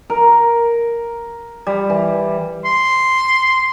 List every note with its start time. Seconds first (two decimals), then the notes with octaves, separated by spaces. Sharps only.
0.10 A#4
1.67 G3
1.90 E3
2.65 C6